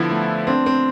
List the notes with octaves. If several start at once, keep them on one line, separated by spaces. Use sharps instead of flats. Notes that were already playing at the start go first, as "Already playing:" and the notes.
Already playing: D3 F3 B3 E4
A3
C4 D4
C4